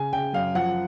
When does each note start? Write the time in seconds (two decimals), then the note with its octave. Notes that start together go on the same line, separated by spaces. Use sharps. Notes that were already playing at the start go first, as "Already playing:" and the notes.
Already playing: C#3 G#5
0.13 C#3 G5
0.33 F#2 F5
0.55 F3 F#5